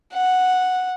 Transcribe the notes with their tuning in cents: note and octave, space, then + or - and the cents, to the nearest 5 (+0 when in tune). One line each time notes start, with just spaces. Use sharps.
F#5 -5